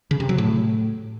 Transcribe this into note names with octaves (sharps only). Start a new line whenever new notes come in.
C#3
C3
F#3
A2